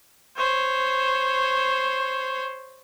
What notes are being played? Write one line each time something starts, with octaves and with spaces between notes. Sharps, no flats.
C5 C#5